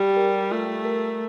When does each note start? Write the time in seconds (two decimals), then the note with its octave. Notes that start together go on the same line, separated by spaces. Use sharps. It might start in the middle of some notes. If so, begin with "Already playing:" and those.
Already playing: G3 G4
0.17 A#4
0.51 A3 F4
0.85 A#4